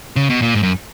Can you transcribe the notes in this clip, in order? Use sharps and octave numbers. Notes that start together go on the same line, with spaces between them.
C#3
B2
A#2
G#2
F#2